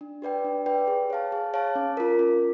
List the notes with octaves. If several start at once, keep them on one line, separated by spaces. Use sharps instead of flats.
D4
G4 B4 D5 G5
D4
G4 B4 D5 G5
G#4
C#5 F5 A5
G#4
C#5 F5 A5
C#4
F4 A#4
C#4